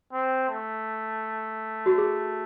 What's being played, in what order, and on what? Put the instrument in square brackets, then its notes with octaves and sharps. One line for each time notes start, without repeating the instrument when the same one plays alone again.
[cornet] C4
A3
[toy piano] F#4
G#4